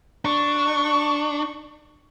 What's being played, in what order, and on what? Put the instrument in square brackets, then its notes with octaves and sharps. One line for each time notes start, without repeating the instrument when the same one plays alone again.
[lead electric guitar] D4 [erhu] C#6